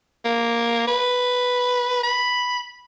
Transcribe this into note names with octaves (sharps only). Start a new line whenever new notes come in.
A#3
B4
B5